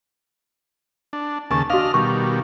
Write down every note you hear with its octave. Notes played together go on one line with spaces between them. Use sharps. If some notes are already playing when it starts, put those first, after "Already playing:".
D4
D#2 C#3 G#5 A5 C#6
D4 F#4 D#5 F5 F6
B2 D#3 G3 C#6